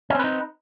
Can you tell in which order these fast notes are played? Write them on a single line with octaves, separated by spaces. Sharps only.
C#4 C4 B4 D#4